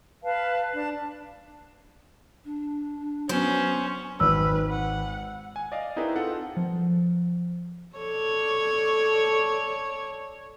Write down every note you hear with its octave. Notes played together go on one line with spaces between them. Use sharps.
B4 F5 A5
D4 A5
D4
F#3 B3 C#4 C5
G#1 B4 E6 F6
F#5
G#5
D5 D#5 F5
C4 D#4 E4 G#4 A#4 B4
C4 F4 A4 F#5
F3
A4 C#5 D5